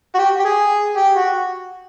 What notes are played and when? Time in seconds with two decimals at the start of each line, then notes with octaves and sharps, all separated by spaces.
0.14 F#4
0.18 G4
0.40 G4
0.45 G#4
0.97 G4
1.16 F#4